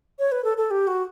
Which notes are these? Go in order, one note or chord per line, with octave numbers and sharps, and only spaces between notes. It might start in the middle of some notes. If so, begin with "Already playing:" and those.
C#5
B4
A4
A4
G4
F#4